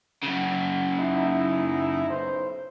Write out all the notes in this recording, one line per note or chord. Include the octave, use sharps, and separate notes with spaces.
F#2 C#3
D#4 E4
B1 C5